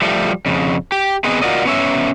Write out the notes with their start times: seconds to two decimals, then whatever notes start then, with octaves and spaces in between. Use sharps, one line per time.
0.02 F3 G3 A3
0.46 F2 C#3
0.92 G4
1.24 B3 C4 G#4 B4 D#5
1.42 F4 F#4 A#4 D5 D#5
1.65 B3 C#4 C#5 E5